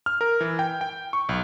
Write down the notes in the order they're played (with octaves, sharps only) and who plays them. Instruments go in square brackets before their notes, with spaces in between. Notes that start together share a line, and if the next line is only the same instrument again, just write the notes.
[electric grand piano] F6
A#4
E3
G5
G5
C#6
B1